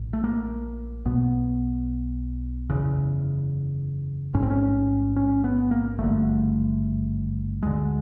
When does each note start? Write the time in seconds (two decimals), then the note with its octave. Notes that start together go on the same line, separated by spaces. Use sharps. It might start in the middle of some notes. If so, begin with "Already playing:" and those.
Already playing: A#1 A2
0.13 A3
0.24 A#3
1.05 B1 B2 B3
2.70 F#1 E2 C#3
4.34 A1 G#2 C#4
4.42 C4
4.50 C#4
5.16 C#4
5.44 B3
5.71 A#3
5.98 G#1 G2 D3 A3
7.63 D2 D3 G#3